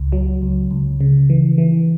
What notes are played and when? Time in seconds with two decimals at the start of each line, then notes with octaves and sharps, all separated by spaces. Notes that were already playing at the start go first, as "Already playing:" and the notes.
Already playing: C#2
0.12 F#3
0.42 C#2
0.71 C#2
1.01 C#3
1.30 E3
1.58 E3